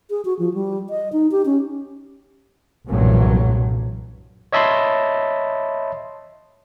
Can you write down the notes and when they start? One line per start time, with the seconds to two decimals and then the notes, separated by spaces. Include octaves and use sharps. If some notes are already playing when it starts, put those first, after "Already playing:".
0.10 G#4
0.25 F#4
0.39 F3
0.54 G3
0.90 D#5
1.13 D#4
1.32 G4
1.46 C#4
2.87 F1 B1 G2 A#2 E3 F#3
4.52 C#5 D#5 E5 A5 B5 C6